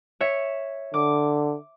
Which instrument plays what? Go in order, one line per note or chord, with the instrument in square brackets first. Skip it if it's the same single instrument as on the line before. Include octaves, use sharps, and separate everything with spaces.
[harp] C#5 E5
[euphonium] D3 [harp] D6